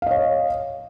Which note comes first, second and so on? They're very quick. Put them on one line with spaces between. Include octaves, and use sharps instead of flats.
F5 D#5 C#5